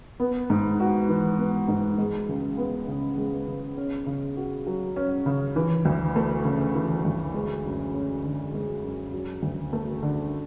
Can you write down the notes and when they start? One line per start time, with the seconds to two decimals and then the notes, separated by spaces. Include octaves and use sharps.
0.20 B3
0.50 G#2
0.80 F#4
1.09 E3
1.38 B3
1.68 G#2
1.98 G#3
2.29 C#2
2.57 B3
2.88 C#3
3.17 G#3
3.48 C#2
3.77 C#4
4.06 C#3
4.36 F#4
4.67 F#3
4.96 C#4
5.26 C#3
5.56 E3
5.85 D2
6.16 A3
6.44 C#3
6.75 E3
7.05 D2
7.34 G#3
7.65 F#2
7.93 C#4
8.24 D3
8.54 G#3
8.83 F#2
9.13 F#3
9.42 D2
9.73 A3
10.03 D3